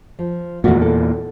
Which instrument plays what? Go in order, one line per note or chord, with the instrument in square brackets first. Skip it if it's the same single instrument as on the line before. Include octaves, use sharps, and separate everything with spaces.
[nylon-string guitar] F3
[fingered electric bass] E2 A#2 [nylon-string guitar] D#3 A3 F#4
[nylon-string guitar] A4